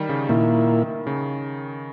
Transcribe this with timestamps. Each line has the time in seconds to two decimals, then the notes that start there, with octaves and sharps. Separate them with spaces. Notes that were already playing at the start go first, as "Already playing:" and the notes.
Already playing: D#3 G3
0.09 C#3
0.29 A#2 D#3 A#3 E4
1.07 C#3